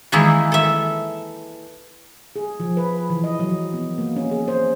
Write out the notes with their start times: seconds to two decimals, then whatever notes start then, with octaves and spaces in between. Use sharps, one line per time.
0.12 D#3 E3 G#3 A#3 E4
0.52 A4 E5
2.36 G#4
2.60 F3
2.77 B4
3.10 E3
3.24 D#5
3.40 F#3
3.74 B3
3.98 A#3
4.16 C#4
4.31 G#4
4.48 C5